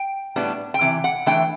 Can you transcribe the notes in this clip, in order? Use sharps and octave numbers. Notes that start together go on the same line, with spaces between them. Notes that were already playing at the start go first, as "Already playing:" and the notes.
Already playing: G5
A2 G3 B3 D4
G5
C3 E3
F#5
E3 A3 D4 G5